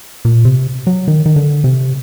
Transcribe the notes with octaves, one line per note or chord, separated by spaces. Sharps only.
A#2
C3
F#3
D#3
D#3
D3
C3